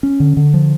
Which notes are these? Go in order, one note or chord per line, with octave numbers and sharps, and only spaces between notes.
C#4
D3
D3
F3